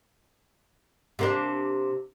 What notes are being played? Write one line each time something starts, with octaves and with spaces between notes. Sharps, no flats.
C3 A#3 D4